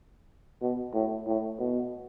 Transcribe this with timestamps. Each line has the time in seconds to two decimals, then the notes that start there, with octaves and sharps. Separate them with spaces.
0.61 B2
0.94 A2
1.27 A2
1.59 B2